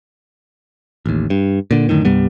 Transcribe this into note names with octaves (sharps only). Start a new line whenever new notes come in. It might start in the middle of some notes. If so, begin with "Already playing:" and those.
A1 D#2
G2
A#2 D3
F#2 A2 D3 D#3
C2 G2 G3 B3